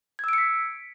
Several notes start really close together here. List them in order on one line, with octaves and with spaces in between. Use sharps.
G#6 E6 D7 C#7 B6